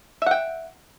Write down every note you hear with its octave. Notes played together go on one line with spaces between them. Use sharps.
E5 F#5 G5